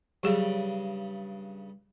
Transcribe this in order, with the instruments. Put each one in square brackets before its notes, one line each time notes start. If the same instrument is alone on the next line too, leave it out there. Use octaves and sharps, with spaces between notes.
[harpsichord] G2 C#3 [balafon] F#3 G#4